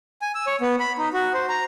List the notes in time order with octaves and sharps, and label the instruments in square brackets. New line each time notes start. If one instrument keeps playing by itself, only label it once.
[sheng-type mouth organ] G#5
E6
C#5
B3
B5
D#4
F#4
C5
A#5